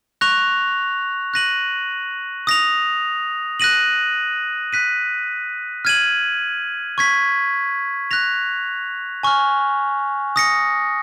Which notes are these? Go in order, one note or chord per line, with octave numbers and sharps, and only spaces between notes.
C#6 F#6 A#6 F7
F#6 A#6 D#7 F#7
D#6 A#6 F7
F#6 A#6 D#7 F#7
F#6 B6 D#7
F6 G#6 D#7 F#7
C#6 G#6 B6
F#6 A#6 F7
G#5 C#6 F6
D#6 A#6 C#7